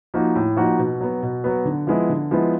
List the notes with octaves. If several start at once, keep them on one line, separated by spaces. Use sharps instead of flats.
F3 A#3 D#4 F#4
A2
F3 A#3 D#4 F#4
B2
F#3 B3
B2
F#3 B3
D3
F3 G#3 B3 E4
D3
F3 G#3 B3 E4